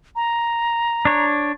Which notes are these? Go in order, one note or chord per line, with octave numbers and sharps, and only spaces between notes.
A#5
D4 C#5